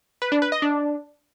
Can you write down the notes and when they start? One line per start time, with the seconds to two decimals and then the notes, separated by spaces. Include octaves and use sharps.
0.22 B4
0.32 D4
0.42 B4
0.52 D#5
0.62 D4